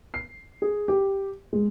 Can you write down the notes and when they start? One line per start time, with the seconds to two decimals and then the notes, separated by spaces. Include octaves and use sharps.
0.14 C7
0.62 G#4
0.88 G4
1.53 G#3